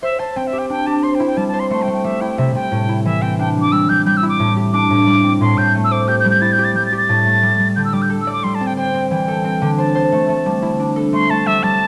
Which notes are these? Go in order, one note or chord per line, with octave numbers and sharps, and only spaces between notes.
C5 E5
C5 A5
C4 G5
E5
G4
G5
D4 G5
G4 A5
C5 C6
G5
E4
G5
G3 A5
A5
C5
C6
A3 C6
G5
A3
G5
G3 E5
E4 G5
C3 E5
C3 G5
A2
E4
E3 E5
C4 G5
D4 G5
G3
D6
G3 E6
G3 G6
G3 G6
E6
E4
D6
A2
G4
D4 D6
A2
G3
C4
A2 C6
A2 G6
A3
E6
C5 D6
G4 G6
G6
G3
G6
E4 A6
G6
G4
A6
G3 G6
A6
G4
A6
A2
A3
G3
G3
D3 G6
E6
G3 D6
G6
A4
E6
D5
D6
G3 C6
A5
C4
G5
C5 G5
C4
E3 G5
A4
C4
D3
C5 A5
C5
A3
A3
G3
E4
D4
A4
A3 C6
A3 A5
G3 E5
G3 A5